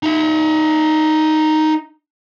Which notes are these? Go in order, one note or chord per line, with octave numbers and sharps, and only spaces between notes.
D#4 E5